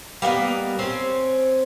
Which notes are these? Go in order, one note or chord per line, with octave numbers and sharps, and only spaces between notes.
G3 A#3 B3 D#5
C4 C#4 C5